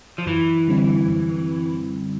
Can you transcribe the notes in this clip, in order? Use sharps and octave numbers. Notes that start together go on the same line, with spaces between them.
F3
F#2 E3
D3 G3 C4 E4
F#2